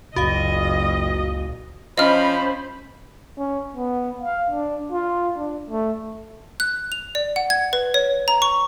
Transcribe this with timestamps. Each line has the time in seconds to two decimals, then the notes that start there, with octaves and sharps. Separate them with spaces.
0.16 F#1 C#2 A#2 F#4 D#5 F5
1.98 F3 C#4 C5 D#5 B5 F6
3.38 C#4
3.76 B3
4.22 F5
4.51 D4
4.92 F4
5.36 D4
5.70 A3
6.60 F#6
6.92 F7
7.15 D5
7.36 F#5
7.50 G#6
7.73 B4
7.94 C#5
8.28 A#5
8.42 C#6